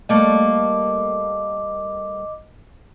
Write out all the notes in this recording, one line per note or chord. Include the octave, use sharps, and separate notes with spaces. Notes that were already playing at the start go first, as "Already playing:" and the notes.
G3 A3 A#3 D#5 D6